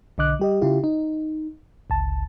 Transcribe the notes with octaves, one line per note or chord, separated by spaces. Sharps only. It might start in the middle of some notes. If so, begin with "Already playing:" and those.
B1 D3 D#5 D6 F#6
G3 G4 D#5
C#3 E4 F4 G4
D#4
G1 C#2 A5